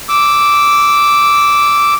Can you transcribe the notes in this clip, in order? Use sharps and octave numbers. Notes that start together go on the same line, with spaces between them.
D6 E6